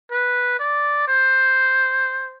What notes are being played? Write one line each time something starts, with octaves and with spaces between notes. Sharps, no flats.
B4
D5
C5